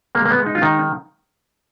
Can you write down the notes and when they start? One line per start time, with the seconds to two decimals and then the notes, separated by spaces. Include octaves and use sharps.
0.15 G#3 A#3
0.26 A#3
0.31 B3
0.38 G#3
0.46 D#4
0.55 F4
0.62 D#3 D#4